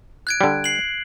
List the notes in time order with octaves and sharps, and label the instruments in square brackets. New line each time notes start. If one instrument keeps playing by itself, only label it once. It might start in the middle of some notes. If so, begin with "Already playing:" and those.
[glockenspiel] F#6 G#6 D7
[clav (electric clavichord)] D3 G3
[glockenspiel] C7 F#7